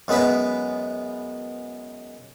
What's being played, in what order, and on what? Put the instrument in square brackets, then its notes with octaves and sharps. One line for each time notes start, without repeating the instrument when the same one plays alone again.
[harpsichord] F#2 G#3 B3 B4 B5